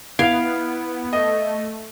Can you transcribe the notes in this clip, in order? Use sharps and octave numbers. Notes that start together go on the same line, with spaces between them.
B3 E4 F5 G#6 D7
A3 D#5